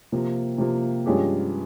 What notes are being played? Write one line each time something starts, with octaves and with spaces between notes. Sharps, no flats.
C3 F3 A#3
C3 F3 A#3
G2 F3 G#3 C#4 G4